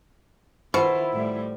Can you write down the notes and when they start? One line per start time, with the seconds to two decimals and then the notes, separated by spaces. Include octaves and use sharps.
0.74 B2 D#3 E4 F4 C5
1.14 A2 G3